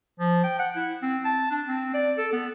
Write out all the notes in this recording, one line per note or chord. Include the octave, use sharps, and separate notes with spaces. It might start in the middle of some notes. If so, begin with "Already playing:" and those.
F3
G5
F#5
E4
C4
A5
D4
C4
D5
A4
B3